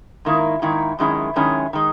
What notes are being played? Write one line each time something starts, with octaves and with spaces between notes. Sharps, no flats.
G#2 D#3 A#3 E4
G#2 D#3 A#3 E4
F#2 D#3 G#3 C#4 E4
F#2 D#3 G#3 C#4 E4
D#3 G#3 D#4